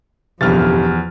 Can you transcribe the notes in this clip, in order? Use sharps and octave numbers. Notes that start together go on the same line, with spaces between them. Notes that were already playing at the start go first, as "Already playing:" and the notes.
F#1 B1 E2 G2 F3 G4 F6 A6